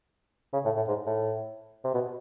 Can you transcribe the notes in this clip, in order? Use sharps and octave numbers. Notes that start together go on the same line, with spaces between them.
C#3
A2
A2
G#2
A2
C3
B2